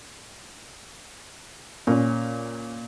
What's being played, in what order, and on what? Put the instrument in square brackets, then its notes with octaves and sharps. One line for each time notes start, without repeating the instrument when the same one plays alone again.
[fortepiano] A#2 [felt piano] C#4